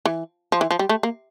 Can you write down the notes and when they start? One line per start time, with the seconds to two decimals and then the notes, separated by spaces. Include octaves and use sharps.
0.05 E3
0.52 F3
0.61 E3
0.71 F3
0.79 G3
0.89 A3
1.03 A#3